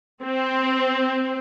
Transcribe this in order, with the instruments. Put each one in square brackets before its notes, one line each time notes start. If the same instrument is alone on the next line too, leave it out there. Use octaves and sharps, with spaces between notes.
[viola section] C4